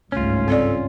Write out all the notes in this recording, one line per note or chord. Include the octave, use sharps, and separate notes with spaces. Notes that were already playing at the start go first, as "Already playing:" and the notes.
G1 C#2 G#2 A3 C#4 F4
C4 A4 D5